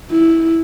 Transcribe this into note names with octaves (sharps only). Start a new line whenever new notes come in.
E4